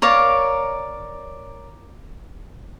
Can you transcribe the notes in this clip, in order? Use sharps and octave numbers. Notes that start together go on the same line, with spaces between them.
A#4 C#5 D5 F5